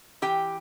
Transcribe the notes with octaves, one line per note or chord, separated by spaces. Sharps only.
E3 G4 G5